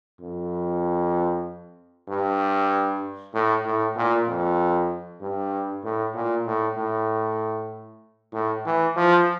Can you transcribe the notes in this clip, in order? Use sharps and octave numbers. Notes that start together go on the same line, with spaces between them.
F2
G2
A2
A2
A#2
F2
G2
A2
A#2
A2
A2
A2
E3
F3